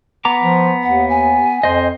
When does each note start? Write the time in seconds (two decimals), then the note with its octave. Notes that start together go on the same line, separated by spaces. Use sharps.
0.25 B3 A#5 D6
0.43 F3
0.83 D#2 F#5
1.09 G#5
1.63 F2 C5 D#5